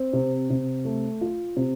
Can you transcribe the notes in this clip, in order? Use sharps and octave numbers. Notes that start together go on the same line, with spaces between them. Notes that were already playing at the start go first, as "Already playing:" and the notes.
Already playing: C4
C3
C3
A3
F4
C3